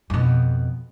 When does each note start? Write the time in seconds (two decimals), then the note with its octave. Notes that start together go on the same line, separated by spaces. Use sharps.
0.10 F2 B2